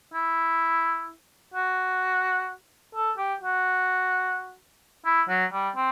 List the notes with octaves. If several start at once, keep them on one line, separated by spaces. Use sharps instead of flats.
E4
F#4
A4
G4
F#4
E4
F#3
G3
C4